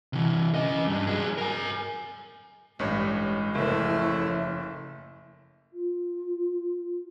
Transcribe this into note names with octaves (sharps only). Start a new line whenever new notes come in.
C3 E3
C#4 D#5
G2
F#3 G#4
A#4 G#5
A1 G2 G#3 C#5
F#1 F3 A3 C#4 E4
F4